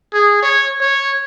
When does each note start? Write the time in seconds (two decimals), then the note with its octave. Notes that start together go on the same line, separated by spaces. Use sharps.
0.13 G#4
0.43 C#5
0.81 C#5